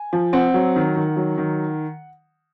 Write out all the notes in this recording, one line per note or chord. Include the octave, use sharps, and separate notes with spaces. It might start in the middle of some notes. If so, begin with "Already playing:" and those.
Already playing: G#5
F3
C4 F#5
F#3
D#3
D#3
F#3
D#3